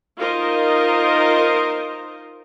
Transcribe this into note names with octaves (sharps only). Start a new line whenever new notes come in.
D#4 F4 A#4 C5 D#5